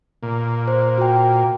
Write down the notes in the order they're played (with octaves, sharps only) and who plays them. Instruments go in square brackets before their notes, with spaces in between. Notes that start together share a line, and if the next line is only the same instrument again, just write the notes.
[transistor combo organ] A#2
[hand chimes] C5
F#4 G5